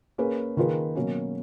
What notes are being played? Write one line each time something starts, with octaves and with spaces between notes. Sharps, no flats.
A#3 C#4 G#4 B4
D#3 A#3 F4 G#4 B4
B2 F#3 A#3 C#4